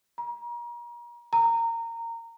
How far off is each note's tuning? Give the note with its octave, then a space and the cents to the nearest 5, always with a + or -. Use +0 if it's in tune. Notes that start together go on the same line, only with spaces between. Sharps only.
A#5 +35
A#5 -20